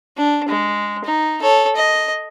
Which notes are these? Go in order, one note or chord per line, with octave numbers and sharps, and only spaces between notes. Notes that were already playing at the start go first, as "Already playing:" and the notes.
D4
G#3
D#4
A4 C#5
D#5